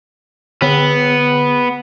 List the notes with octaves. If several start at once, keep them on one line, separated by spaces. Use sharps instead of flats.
D3 B3